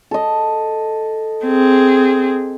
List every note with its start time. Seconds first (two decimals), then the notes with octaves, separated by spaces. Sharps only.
0.11 A4 D#5
1.46 C4 G#4